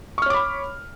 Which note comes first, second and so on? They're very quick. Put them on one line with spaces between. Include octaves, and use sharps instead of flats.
C#6 F6 C#5 D6 B5